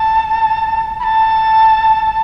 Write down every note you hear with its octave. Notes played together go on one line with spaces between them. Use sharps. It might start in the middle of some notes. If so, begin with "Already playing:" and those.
Already playing: A5
B5
A5